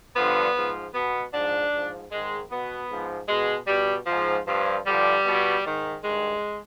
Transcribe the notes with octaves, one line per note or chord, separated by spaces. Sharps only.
G2 D3 F3 B3
G#2 F3
B2 B3
G#2 F3 D4
G#2 F3
G#2 D#3 G#3
B2 B3
G#2 F3
B2 G#3
B2 G3
G#2 F3
G2 F3
G2 D3 F3 G3
B2
G#2 D#3
G2 D#3 G#3